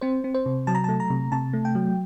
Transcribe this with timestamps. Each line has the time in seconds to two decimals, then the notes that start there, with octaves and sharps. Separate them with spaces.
0.01 C4 C5
0.24 C4
0.34 C5
0.46 C3
0.67 F#3 A5
0.75 A#5
0.84 A3 A5
1.00 A#5
1.10 C3
1.32 C3 A5
1.53 A3
1.65 G5
1.75 F#3